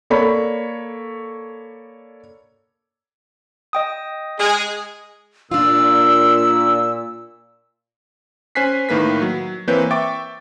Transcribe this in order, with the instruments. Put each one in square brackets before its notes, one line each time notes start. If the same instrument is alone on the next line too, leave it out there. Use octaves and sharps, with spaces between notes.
[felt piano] A#3 A4 C#5 D5 B5
[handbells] D#5 G5 D#6
[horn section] G#3 G#4
[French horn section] A#2 [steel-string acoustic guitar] D4 F4 [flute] E6
[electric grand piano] C#4 C5 G#5 F#6 B6 C7
A2 D#3 A#3 B4 B6
F#3
E3 A#3 C4 B4 C#5 G6
E5 G5 C#6 D6 A6